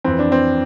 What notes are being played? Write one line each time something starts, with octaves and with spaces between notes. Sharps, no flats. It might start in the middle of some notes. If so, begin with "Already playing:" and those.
F2 E3 C4
D4
C4